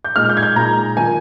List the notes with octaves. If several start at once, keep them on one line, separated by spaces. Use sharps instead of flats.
G6
A#2 G#3 D#4 F6
G6
G#6
G6
A#2 G#3 D#4 A#5
D#3 A#3 F4 G#5